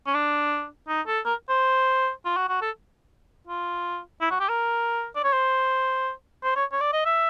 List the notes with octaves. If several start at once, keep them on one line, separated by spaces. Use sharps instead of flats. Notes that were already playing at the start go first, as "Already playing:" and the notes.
C#4
D4
D#4
A4
A#4
C5
F4
F#4
F#4
A4
F4
E4
F#4
G4
A#4
D5
C#5
C5
C5
C#5
C#5
D5
D#5
E5